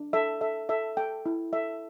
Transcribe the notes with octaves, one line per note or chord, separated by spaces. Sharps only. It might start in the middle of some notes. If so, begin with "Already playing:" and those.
Already playing: D4
A4 E5
A4 E5
A4 E5
A4 G5
E4
A4 E5